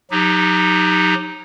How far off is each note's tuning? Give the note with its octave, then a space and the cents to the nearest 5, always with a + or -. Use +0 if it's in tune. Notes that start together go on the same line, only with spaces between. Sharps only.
F#3 -30 D#4 +0 G4 +20